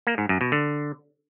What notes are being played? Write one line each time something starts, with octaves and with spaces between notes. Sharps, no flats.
A#3
G#2
F#2
B2
D3